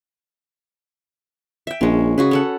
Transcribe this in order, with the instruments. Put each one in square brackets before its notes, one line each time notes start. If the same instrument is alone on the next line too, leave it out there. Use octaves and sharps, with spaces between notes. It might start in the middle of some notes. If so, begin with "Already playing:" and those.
[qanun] E5 G5
[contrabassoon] A#1 [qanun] G#3 C#4
[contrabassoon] C#3 [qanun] F#4 G#4 B4
[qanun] C#4 A4 F#5